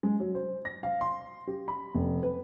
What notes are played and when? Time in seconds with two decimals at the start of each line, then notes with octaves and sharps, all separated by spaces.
0.03 G#3
0.20 F#3
0.35 C5
0.65 A#6
0.83 F5
1.01 C6
1.47 G4
1.68 B5
1.94 F1
2.23 B4